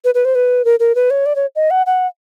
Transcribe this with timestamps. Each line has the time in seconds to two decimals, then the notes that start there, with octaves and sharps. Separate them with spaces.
0.04 B4
0.14 B4
0.25 C5
0.35 B4
0.65 A#4
0.80 A#4
0.95 B4
1.10 C#5
1.26 D5
1.35 C#5
1.55 D#5
1.70 F#5
1.86 F#5